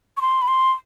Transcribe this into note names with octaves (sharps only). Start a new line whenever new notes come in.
C#6
C6
B5
C6